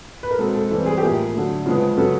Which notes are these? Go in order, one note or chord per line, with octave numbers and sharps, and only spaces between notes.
B4
A#4
B2 G#3 C4 A4
A4
E3 G3 C4 A4
G#4
G4
A2 F3 A#3 G#4
D3 F#3 A3
C#3 F3 G#3 B3
C#3 F#3 B3 A4